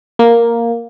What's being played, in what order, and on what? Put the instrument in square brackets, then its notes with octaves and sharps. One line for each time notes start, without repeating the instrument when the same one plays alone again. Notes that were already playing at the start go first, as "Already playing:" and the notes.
[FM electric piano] A#3